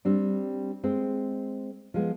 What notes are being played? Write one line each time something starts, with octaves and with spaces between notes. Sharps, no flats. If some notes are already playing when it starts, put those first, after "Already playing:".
G3 C4 D4
G#3 C4
F3 G#3 B3